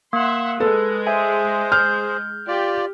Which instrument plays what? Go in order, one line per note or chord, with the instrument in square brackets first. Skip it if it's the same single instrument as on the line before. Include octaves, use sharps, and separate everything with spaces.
[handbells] A#3 [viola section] E5 F#5 C6
[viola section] G#3 [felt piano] A4 [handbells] B4
[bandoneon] G#4 C5 [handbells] E5 G#5
[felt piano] F6 [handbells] G6
[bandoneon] F4 D5 [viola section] G4